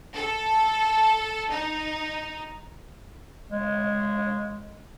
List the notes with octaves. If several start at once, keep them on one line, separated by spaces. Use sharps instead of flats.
A4
D#4
G#3